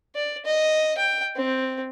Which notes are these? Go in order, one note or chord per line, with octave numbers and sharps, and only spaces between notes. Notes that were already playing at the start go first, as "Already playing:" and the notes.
D5
D#5
G5
C4